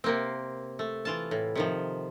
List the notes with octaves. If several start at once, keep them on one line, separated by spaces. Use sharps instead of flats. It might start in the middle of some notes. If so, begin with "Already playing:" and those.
C3 A#3 C4
A3
E3 F4 A5
A2
C3 D#3 F3